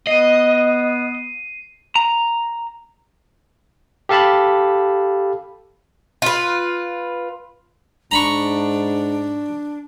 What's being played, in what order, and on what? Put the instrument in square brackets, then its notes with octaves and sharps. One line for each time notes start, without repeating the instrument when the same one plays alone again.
[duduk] B3 [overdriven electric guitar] D#5 [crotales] C7 D#7
[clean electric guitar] A#5
[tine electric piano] G4 A4 F5 A5 B5
[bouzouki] F4 B4
[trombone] G#2 [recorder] D4 [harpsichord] A#5 B5 C#6